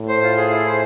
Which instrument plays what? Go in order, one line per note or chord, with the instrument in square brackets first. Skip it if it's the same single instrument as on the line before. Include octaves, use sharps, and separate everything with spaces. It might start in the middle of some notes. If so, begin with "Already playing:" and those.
Already playing: [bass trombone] A2
[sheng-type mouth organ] C5
F4
G#4
E4
C5